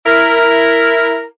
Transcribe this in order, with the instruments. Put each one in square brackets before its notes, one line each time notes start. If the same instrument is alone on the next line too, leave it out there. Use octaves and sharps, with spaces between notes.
[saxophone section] E4 A#4